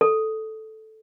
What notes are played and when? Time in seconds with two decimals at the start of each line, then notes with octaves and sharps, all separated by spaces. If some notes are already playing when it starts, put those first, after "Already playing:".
0.01 A4